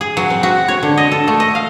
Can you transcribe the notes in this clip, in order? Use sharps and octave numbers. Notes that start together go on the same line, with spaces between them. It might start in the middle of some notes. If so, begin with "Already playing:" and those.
G#4
F#3
C4
F#4
C#5
D3
D#5
A4
A3
D#5
F5